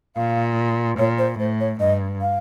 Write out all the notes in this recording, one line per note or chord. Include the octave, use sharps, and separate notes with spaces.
A#2 F5
A#2 C#5
C5
A2 C5
C#5
G2 D#5
F5